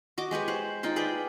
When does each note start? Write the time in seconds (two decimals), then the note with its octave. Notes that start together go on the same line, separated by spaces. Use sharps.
0.18 F#4 D#5 D6
0.31 G#3 G4 B4 C#5
0.48 C5 F#5
0.83 D#4 F4 G5 C6
0.96 G#4 B4 D5 G5